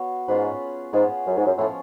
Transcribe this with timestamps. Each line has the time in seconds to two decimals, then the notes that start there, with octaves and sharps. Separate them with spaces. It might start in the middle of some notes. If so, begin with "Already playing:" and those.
Already playing: B3 F#4 C#5 F5
0.28 G#2 C#4 F4 G#4 B4
0.93 G#2 B3 F4 G#4
1.26 F#2
1.36 G#2
1.46 F#2
1.58 A2 F3 G#3 C#4 F4